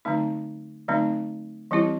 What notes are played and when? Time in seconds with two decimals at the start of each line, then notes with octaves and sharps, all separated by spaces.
0.05 D3 F#3 A3 C4 D#4
0.88 D3 F#3 A3 C4 D#4
1.71 E3 G3 C4 E4 G4